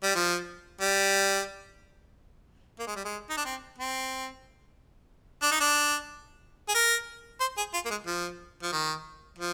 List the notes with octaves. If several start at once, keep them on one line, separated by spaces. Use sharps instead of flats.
G3
F3
G3
A#3
G#3
G3
G#3
D#4
D4
C4
C4
D4
D#4
D4
G#4
A#4
C5
G#4
F4
A#3
G#3
F3
F3
D#3
F3